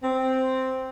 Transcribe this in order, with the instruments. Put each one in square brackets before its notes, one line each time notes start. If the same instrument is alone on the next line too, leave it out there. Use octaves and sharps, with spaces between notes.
[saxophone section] C4